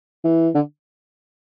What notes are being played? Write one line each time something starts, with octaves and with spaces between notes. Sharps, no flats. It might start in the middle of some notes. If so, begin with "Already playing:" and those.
E3
D3